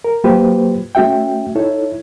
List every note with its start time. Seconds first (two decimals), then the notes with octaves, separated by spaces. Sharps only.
0.05 A#4
0.24 F#3 A#3 F4 G4 B4 C5
0.95 A3 C#4 F#4 E5 G5
1.55 D#4 E4 A4 C#5